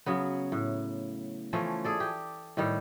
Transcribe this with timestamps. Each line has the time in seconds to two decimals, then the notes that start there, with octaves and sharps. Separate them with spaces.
0.06 C#3 F#3 B3
0.52 A2
1.53 E3 F3 A3 C#4
1.84 G#4 A4 D5
2.00 G4
2.57 A2 D#3 G3